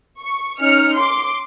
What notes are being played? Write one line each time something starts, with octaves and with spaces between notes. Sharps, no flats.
C#6
C#4 D#4 F6 C#7
C6 D6 C7